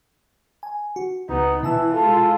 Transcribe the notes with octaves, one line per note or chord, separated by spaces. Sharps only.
G#5
F#4
C#2 B3 D#4
B2 E3 E4 A5 E6
G#3 F4 A4